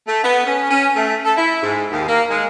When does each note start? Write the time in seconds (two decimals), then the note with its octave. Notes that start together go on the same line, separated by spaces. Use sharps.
0.08 A3
0.24 B3
0.47 C#4
0.71 C#4
0.96 A3
1.25 A4
1.37 E4
1.63 G#2
1.91 D#2
2.08 A#3
2.31 G#3